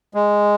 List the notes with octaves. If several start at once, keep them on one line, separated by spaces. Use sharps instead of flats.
G#3